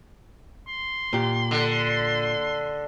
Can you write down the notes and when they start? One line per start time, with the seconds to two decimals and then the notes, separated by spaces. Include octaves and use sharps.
0.68 C6
1.13 A#2 G4
1.51 D3